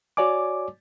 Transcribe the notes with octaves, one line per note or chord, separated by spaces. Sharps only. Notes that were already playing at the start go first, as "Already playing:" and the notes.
F#4 C#5 D5 G#5 D6